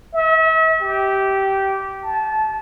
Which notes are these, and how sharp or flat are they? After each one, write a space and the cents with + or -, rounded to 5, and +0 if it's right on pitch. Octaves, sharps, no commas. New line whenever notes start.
E5 -40
G4 -15
A5 -25